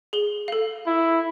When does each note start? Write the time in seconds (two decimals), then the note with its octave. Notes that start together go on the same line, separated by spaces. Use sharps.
0.13 G#4 G7
0.48 A4 F5
0.87 E4